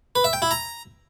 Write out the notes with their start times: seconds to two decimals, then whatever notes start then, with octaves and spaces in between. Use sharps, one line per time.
0.15 B4
0.24 E5
0.33 G5
0.42 E4
0.51 A#5